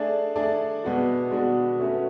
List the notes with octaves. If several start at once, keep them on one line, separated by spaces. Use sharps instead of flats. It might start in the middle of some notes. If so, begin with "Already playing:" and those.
Already playing: A3 D4 G#4 D5
A3 D4 G#4 D5
B2 G#3 B3 D4 F#4
B2 G#3 B3 D4 F#4
A3 C#4 F#4 B4